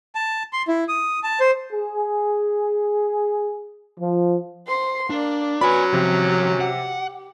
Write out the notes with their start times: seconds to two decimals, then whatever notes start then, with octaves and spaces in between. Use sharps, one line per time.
0.15 A5
0.53 C6
0.68 E4
0.88 D#6
1.23 A5
1.40 C5
1.73 G#4
3.99 F3
4.67 C5 C6
5.10 A#3 D4 D5
5.61 F#3 C#4 B4 D5 G#5 B5
5.93 C3 F3 G3 G4
6.60 F#5